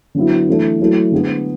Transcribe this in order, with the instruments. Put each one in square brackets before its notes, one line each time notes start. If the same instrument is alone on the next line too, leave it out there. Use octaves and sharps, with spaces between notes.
[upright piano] D3 F#3 B3 E4
E3 A3 D4 A4
F#3 A3 E4 A4
D3 G#3 B3